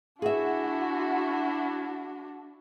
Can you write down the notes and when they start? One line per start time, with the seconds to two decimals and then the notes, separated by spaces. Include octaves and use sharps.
0.22 D4 E4 F#4 G#4 E5